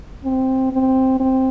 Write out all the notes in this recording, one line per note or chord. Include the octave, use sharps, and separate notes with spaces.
C4
C4
C4